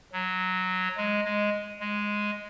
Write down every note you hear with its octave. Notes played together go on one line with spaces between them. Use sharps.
F#3
G#3
G#3
G#3